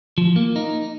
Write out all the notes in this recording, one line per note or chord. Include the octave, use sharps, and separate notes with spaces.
F3
A#3
D#4